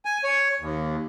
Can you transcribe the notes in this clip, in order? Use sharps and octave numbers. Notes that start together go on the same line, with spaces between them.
G#5
C#5
D#2